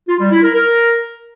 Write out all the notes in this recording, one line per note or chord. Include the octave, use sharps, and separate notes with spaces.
F4
G3
E4
A#4
A#4